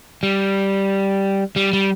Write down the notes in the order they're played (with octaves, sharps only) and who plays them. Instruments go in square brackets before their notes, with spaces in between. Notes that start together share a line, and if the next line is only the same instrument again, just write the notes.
[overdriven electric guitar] G3
G3
G3